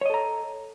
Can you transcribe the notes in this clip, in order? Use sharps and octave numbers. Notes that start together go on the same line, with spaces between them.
A4 C#5 D#5 A#5